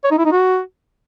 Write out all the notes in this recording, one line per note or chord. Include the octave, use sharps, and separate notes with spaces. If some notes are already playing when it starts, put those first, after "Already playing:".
C#5
D#4
E4
D#4
F#4